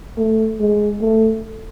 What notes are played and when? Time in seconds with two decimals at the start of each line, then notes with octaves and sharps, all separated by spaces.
0.18 A3
0.60 G#3
1.01 A3